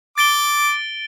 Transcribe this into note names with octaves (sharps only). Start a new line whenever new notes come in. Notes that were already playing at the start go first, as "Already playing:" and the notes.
D6 A6 D7 G7